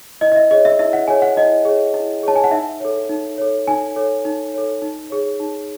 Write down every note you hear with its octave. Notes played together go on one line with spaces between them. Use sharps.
E4 D#5
D#5
E5
G#4 C#5 D#5
E5
E4 E5
F#5
G#4 C#5 G#5
F#5
E4 D#5
G#4 C#5
E4
G#4 C#5 A5
G#5
F#5
D#4 E5
A4 C#5
D#4
A4 C#5
D#4 G#5
A4 C#5
D#4
A4 C#5
D#4
G#4 C#5
D#4